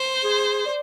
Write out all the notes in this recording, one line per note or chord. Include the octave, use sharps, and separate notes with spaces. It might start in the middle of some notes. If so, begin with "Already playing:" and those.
Already playing: C5
G#4
D5